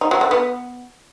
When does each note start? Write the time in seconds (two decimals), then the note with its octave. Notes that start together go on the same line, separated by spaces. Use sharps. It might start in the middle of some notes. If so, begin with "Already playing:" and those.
0.01 D#4
0.11 F#3
0.21 D3
0.31 B3